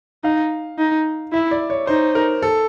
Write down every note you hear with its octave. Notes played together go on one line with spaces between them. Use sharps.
D#4 F5
D#4
E4 E5
D5
C#5
D#4 C5
A#4
A4